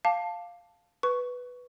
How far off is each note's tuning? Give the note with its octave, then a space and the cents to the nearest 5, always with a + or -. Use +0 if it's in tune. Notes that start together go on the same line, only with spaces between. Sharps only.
F5 +0 A5 +0 D6 +0
B4 +0 C#6 +5